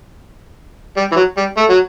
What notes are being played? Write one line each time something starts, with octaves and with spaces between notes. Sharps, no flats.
G3
E3
F#3
G3
A3
F#3